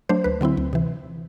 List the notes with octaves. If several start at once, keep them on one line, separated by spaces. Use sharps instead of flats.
F#3 A3 D4 C5
D2 B4
D3 F#3 C4 E4
D2
C3 E3